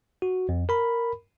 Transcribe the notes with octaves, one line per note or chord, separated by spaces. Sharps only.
F#4
F2
A#4 B5